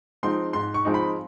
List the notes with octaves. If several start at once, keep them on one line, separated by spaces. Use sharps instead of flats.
F3 G#3 C4 D#4 C6
G#2 C6
C#6
F3 G#3 C4 D#4
B5